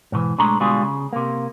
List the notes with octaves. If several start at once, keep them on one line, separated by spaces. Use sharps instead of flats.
G#2 B2 D#3 E3
B1 G#3 A3 D4 A#5 B5
B2 D3 G3 G#3 F4 G#4
C#3
C3 A#3